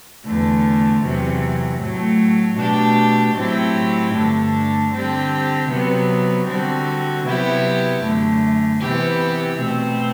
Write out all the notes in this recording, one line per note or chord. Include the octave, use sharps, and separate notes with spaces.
E2 D3 A3
E2 C3 F#3
A2 F#3 A3
B2 A3 D4 G4
A2 F#3 C4 E4 G4
G2 D3 A3 D4
D3 G3 C4 G4
C3 F#3 B3
D3 G3 C4 F#4
C3 F#3 B3 E4 G4
F#2 D3 A3
C3 E3 B3 E4 G4
B2 A3 C4